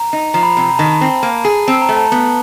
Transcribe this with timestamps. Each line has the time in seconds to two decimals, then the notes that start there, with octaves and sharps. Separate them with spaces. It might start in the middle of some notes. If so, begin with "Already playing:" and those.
Already playing: A#5
0.13 D#4
0.34 F3 A#5
0.43 B5
0.51 A#5
0.57 C3
0.78 D#3 A5
1.01 C4
1.23 A#3
1.45 G#4
1.67 C4 A5
1.81 A#5
1.89 A3
1.96 A5
2.12 B3